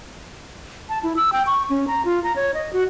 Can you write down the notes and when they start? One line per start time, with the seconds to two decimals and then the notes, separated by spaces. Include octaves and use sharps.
0.89 A5
1.03 E4
1.16 E6
1.32 G5
1.47 C#6
1.70 C#4
1.88 A#5
2.05 F4
2.24 A#5
2.36 C#5
2.54 D#5
2.73 F#4